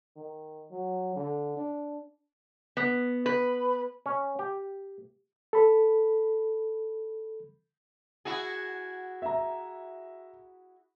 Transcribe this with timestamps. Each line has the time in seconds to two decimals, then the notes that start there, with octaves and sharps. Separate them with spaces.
0.16 D#3
0.71 F#3
1.16 D3
1.57 D4
2.77 B3
3.26 B4
4.06 C#4
4.39 G4
5.53 A4 B5
8.25 E4 F#4 G#4
9.22 E5 A#5